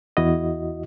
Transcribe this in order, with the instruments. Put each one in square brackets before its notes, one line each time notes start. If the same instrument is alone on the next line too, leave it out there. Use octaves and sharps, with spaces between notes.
[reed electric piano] E2 E4 F#4 D#5